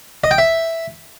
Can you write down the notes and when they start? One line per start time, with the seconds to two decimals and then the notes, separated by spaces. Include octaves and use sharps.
0.24 D#5
0.31 G5
0.38 E5